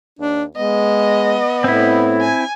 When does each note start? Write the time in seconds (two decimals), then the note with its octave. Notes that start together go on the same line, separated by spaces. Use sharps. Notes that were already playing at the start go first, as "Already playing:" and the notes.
0.19 D#2 D4
0.56 G#3 B3 D#5
1.64 A2 C4 E4
2.21 G#5